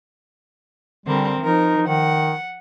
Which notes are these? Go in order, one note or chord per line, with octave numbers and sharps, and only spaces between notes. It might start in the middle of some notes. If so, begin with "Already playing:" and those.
D3 G3 C4 A#4
F3 D#4 A#4
D#3 F#5